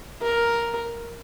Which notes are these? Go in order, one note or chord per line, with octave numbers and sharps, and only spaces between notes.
A#4